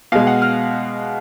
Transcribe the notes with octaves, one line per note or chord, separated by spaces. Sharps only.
B2 G#3 F5
F#5
F6